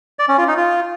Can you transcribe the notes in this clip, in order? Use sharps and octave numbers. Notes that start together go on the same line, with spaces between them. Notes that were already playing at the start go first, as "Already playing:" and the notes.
D5
C#4
F4
D#4
F4